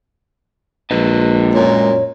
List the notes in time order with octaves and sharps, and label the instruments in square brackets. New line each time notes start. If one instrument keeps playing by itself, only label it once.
[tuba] A#1 [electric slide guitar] G#3 B4 D#5
[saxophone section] F#2 A#2 [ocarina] C#5